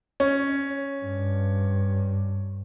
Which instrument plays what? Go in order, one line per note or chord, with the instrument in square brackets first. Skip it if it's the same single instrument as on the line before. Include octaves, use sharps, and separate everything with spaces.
[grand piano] C#4
[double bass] G2